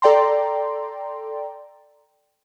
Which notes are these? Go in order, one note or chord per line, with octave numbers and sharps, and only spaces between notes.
A4 D5 G5 A#5 C6